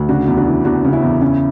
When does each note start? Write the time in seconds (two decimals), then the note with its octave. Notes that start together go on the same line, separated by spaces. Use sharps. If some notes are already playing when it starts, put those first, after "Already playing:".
Already playing: D2
0.09 C#3 D4 F#4
0.28 E2
0.37 D4 F#4
0.46 E3
0.65 E2 D4 F#4
0.84 C#3
0.93 C#4 E4
1.03 E2
1.21 C#3 C#4 E4